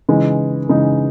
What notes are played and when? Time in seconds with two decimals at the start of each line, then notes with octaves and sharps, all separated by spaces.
0.09 C#3 E3 G#3 D#4
0.69 C#3 E3 G#3 D#4